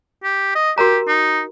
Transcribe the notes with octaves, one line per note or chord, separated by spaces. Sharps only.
G4
D#5
F#4 G4 A#4 A#5
D#4